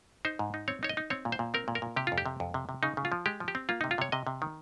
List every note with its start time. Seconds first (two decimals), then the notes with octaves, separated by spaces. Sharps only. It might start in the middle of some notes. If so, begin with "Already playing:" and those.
0.25 D#4 C5
0.39 G#2
0.54 D#4
0.68 C4 C#5
0.83 D#4 C#5
0.89 D#5
0.97 D#4
1.10 C4 C#5
1.25 A#2
1.32 C5
1.39 A#2
1.54 C4 A#4
1.68 A#2
1.75 A#4
1.82 A#2
1.96 C3 G4
2.07 F2 F4
2.18 G4
2.26 C3
2.40 F2
2.54 C3
2.69 C3
2.83 C#3 D#4
2.97 C#3
3.05 F4
3.12 F3
3.26 G#3 G4
3.40 F3
3.48 G4
3.55 C4
3.69 A#3 F4
3.81 C3 D#4
3.91 F4
3.98 C3 C#5
4.12 C3 D#5
4.27 C3
4.42 D#3